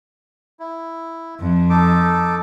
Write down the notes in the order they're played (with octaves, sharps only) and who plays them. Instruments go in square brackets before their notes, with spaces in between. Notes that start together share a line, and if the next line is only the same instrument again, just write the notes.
[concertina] E4
[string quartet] F2
[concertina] D#4 A4 D6